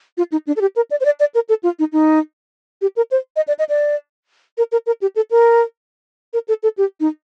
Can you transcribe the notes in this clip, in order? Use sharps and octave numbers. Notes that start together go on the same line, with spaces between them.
F4
D#4
D4
A4
G4
A#4
D5
C5
D5
D5
A#4
A4
F4
D#4
D#4
G4
A#4
C5
D#5
D5
D#5
D5
A#4
A#4
A#4
G4
A4
A#4
A#4
A4
A4
G4
D#4